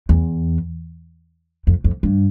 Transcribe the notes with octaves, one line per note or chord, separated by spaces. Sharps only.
E2
F2
F2
G2